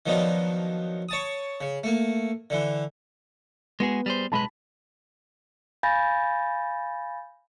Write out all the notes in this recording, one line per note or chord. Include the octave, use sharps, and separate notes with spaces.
D#3 F3 F#3 B3 D4 D#4
C#5 A5 D#6
C#3
A3 A#3
D3 E3
G#3 B3 F#4 G#4
G3 G#4 C5
B1 G#3 B4 A5 B5
F5 G#5 B5 G6 A6 A#6